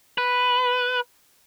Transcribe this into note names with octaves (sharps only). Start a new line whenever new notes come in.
B4